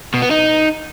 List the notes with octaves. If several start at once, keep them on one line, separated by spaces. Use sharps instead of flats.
B2
B3
D#4